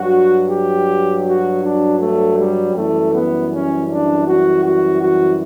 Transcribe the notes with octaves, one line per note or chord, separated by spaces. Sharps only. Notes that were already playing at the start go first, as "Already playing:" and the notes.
Already playing: G2 F#3 F#4
G4
F#4
D4
A3
G3
F#2 E3 G3 A3
B3
C#4
D4
F#4
F#4
F#4